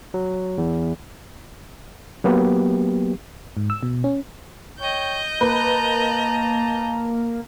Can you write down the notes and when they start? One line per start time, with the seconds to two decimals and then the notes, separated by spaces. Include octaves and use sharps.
0.14 F#3
0.58 E2
2.24 F#3 A#3 B3 G4
3.57 G#2
3.70 E6
3.83 B2
4.04 C#4
4.79 C#5 D#5 G5 G6
5.41 A#3 B4 A5 A#5